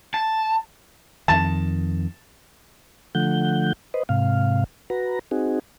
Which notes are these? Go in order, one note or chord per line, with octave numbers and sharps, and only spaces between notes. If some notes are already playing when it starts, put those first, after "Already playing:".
A5
F2 D#3 A5
D3 F3 A3 F#5 G6
B4 C5 D#5
G#2 C3 F5
F#4 B4 A#5
C4 D#4 F#4 G#4